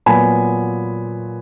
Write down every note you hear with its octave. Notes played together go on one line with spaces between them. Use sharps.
A#2 F#3 B3 F4 G#5 B5